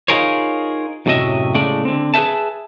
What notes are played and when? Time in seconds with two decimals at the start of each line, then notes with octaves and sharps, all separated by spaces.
0.08 D#4 F4 G#4 A#4 C5 C#5
1.06 F#2 A2 C3 F#3 D#5 E5
1.54 A2 C#3 G#3 A3 D5
1.85 D3 C4
2.14 G#4 B4 C5 E5 A5